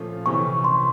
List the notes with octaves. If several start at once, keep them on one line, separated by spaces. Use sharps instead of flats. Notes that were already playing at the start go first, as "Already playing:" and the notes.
Already playing: A#2 F3 A3 C#4 F4
C3 E3 A3 C#4 C#6
C6